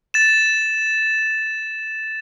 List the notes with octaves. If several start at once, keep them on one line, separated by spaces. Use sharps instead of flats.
A6 E7